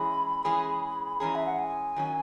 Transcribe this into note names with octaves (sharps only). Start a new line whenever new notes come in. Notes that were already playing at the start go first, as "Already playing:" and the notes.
Already playing: E3 G#3 C#4 G#4 B5
E3 G#3 C#4 G#4
E3 G#3 C#4 G#4 A#5
E5
F#5
G#5
D#3 F#3 C#4